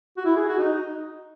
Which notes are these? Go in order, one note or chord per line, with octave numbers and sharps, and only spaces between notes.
F#4
E4
G#4
F#4
D#4